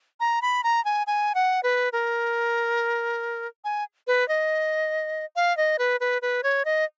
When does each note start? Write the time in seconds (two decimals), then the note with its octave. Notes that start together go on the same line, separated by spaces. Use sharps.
0.20 A#5
0.42 B5
0.64 A#5
0.85 G#5
1.07 G#5
1.35 F#5
1.63 B4
1.93 A#4
3.64 G#5
4.07 B4
4.28 D#5
5.36 F5
5.57 D#5
5.79 B4
6.00 B4
6.22 B4
6.43 C#5
6.65 D#5